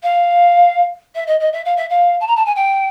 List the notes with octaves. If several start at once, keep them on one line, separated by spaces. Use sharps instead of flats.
F5
E5
D#5
D#5
E5
F5
E5
F5
A5
A#5
A5
G#5
G5